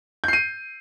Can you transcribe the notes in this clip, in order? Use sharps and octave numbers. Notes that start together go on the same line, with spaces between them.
G6 C7 D#7